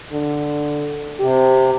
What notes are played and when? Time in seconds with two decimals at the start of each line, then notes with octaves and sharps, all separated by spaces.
0.13 D3
1.20 C3 G4